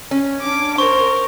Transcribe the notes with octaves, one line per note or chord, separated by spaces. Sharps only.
C#4
D4 D6
A#4 C5 C#6